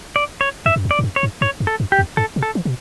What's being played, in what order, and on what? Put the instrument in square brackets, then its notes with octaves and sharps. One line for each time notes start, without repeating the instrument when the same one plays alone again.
[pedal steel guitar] D5
C#5
[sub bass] F#2 [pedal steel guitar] E5
[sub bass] F#2
E2
[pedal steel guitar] D5
[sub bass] G2
F#2
[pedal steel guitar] C#5
[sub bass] G2
[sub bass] G2 [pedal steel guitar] C#5
[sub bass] F#2
[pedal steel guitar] A4
[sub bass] F#2
[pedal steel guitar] G4
[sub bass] E2
[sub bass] G2 [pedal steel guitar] A4
[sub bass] B2
[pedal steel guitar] A4
[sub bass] E3
B2